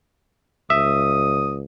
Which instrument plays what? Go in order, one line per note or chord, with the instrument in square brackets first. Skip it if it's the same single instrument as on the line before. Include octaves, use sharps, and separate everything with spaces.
[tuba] C#2 [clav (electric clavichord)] E5 [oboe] D#6